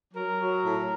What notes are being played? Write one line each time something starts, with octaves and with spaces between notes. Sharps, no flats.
F#3 A#4
F#3
A2